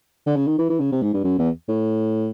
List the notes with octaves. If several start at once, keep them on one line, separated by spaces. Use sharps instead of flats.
D3
C#3
D#3
E3
E3
C#3
C3
G#2
G2
F#2
E2
A2